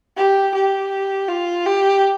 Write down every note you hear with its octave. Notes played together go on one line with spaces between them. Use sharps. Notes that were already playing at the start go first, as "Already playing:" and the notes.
G4
G4
F4
G4